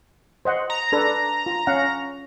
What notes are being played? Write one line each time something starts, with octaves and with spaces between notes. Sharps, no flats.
C5 D#5 F#5
A#5
D4 A4 B4
F4
C#4 F5 F#5